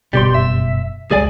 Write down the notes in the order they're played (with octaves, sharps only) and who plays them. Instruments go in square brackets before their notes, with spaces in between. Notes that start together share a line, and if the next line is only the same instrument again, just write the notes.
[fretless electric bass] F#1 G2 B2 [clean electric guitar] G3 G4 C6
[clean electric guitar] E5
[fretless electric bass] C#2 G#3 [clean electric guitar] G#4 D5 G#5